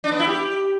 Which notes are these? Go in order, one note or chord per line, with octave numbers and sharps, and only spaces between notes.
D4
B3
E4
G4